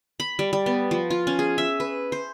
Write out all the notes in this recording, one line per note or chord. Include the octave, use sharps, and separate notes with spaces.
B5
G3
G3
B3
F3
F4
C#4
G#4
E5
B4
C5